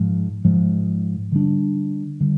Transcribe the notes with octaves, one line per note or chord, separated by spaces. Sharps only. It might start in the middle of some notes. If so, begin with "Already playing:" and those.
Already playing: G#2 F3 G#3
G#2 F3 G#3
D3 G3 D4
D3 G3